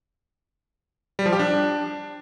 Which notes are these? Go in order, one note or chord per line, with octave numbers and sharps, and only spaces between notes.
G3
F3
G4
D4